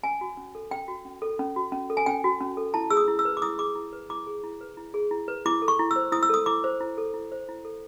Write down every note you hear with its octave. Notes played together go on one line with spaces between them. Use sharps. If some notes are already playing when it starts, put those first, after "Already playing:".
C#4 G#5
F#4
C#4
A4
C#4 G5
F#4
C#4
A4
C#4
F#4
C#4
A4
G#5
C#4 G5
F#4
C#4
A4
E4 A5
G#4 E6
D#6
E4
E6
B4
D6
E4 D#6
G#4 D6
E4
B4
E4 D6
G#4
E4
B4
E4
G#4
E4
B4
E4 D6
A4
C#6
E4
E6
C5
E4 D#6
E6
A4 D#6
E4 D6
C5
E4
A4
E4
C5
E4
A4